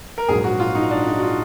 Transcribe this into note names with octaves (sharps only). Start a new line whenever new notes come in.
A#4
A#1 G#2 F#3 G#4
F#4
F4
D#4
D4
D#4
F#4
F4